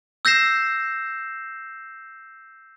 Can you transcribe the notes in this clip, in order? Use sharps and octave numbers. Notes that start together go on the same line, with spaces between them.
E6 G6 A#6 C7 E7